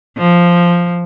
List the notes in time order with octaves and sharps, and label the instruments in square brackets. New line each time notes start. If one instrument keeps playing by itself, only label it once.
[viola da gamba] F3